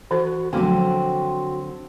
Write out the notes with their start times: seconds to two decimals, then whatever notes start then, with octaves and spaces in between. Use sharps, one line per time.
0.11 E3 F#4 A4 C5
0.53 D3 F3 F#3 A3 B3 C4 F#4